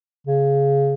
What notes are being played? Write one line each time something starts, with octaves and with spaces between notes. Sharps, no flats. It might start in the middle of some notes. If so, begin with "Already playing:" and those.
C#3